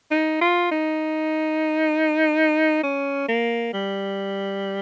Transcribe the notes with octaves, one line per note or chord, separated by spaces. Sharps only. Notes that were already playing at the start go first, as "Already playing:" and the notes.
D#4
F4
D#4
C#4
A#3
G3